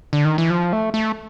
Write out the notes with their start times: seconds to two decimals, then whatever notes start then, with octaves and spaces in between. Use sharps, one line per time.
0.13 D3
0.25 D#3
0.38 E3
0.50 F3
0.73 A3
0.94 A3